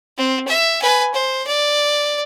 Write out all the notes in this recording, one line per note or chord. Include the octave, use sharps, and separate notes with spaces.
C4
E5
B4 G#5
C5
D5